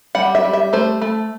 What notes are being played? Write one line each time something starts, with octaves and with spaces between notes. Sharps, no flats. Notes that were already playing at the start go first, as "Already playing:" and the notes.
G3 F#5
E5
G3
E5
A3 C5
A3